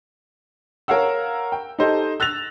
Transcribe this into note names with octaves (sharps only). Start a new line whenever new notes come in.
A#4 C#5 F5 F#5 E6
G5
D#4 G4 A4 C5 D#5
E6 F#6 A6 A#6 F7